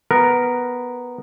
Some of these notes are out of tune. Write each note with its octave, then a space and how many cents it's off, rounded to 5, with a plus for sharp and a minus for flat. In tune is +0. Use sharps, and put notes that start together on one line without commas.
B3 +0 A#4 +0